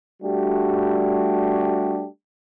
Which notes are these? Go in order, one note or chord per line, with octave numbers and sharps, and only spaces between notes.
G3 A3 D4 F#4 G4